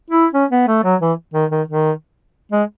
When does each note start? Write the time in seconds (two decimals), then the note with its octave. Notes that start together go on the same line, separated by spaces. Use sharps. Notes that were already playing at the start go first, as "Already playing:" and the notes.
0.10 E4
0.33 C#4
0.51 B3
0.67 A3
0.84 F#3
1.01 E3
1.33 D#3
1.51 D#3
1.68 D#3
2.52 G#3